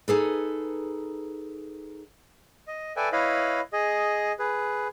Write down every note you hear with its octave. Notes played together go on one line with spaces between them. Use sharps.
D#4 G#4 A4 B4
D#5
A4 B4 D5 E5 G5 G#5
E4 B4 C#5 D#5 F5 B5
G#4 D#5
G#4 B4